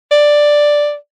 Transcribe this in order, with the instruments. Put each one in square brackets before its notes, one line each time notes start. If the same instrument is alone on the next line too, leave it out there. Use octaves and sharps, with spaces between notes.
[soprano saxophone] D5